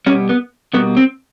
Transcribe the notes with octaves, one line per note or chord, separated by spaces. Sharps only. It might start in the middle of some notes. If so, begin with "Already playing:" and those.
B2 G3 B3 C#4
B3
B2 G3 A#3 B3
C4